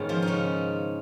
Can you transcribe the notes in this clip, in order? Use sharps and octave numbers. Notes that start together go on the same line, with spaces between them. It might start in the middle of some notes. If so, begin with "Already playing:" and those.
Already playing: G#2 D#3 B3 C#4 G#4 C#5
F3 F4
D#4
C#3 C#4